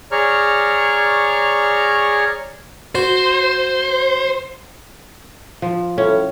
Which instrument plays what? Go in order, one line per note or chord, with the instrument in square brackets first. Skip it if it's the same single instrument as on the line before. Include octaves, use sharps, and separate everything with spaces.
[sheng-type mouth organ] G#4 C#5 D5 A#5 C#6 F6
[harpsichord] F#4 [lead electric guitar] C5
[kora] F3
[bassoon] A2 [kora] C#4